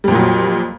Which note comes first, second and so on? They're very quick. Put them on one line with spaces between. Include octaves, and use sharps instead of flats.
G3 F2 A#2 F#3